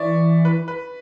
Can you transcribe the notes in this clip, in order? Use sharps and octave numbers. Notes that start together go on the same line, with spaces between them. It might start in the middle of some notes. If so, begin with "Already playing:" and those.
Already playing: E3 D5 E5 C#6
B4
B4